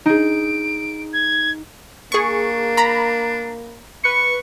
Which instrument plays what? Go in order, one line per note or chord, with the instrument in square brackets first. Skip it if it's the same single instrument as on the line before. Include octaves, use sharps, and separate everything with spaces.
[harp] D#4 G#4 [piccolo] D7
[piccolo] G#6
[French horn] A#3 [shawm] D4 [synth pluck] G#4 C#6
[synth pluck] A#5 B5
[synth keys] B4 C#7 [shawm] C#6